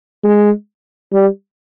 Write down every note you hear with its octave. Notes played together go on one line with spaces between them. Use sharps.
G#3
G3